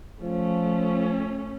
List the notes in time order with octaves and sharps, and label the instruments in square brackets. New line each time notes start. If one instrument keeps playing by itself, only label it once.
[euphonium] F3 [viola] A3 C#4